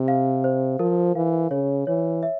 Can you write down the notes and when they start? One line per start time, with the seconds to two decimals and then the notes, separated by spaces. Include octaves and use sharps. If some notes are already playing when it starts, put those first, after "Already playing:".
Already playing: C3
0.08 F5
0.44 C5
0.79 F3 A#4
1.15 E3 F5
1.51 C#3 C#5
1.87 E3 C#5
2.23 E5